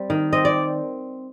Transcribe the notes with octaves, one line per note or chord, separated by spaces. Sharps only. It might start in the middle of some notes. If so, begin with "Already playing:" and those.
Already playing: G3 C4
D#3
C4 D#5
D5